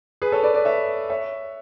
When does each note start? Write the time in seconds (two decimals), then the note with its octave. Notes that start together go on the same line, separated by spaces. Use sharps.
0.22 G#4 B4
0.32 A4 C#5
0.43 B4 D5
0.54 B4 D5
0.65 C#5 E5
1.10 C#5 E5